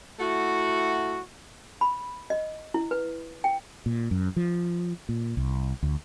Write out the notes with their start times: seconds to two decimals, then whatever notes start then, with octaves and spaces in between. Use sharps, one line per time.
0.20 A3 E4 F#4
1.81 B5
2.30 D#5
2.74 E4
2.91 B4
3.44 G5
3.86 A#2
4.11 F#2
4.36 F3
5.09 A#2
5.37 C2
5.83 D2